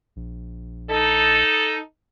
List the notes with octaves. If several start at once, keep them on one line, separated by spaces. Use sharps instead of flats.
A#1
D#4 A4